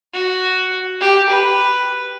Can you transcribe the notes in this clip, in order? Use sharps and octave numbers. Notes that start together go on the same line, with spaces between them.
F#4
G4
B4